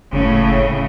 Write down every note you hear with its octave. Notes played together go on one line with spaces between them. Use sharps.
F#1 A2 C#3